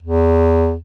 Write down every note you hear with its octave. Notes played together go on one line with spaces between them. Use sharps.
E2